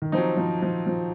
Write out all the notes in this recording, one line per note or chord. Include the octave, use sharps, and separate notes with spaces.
D#3
F3 F#3 C4 D#4
F3
F3
F3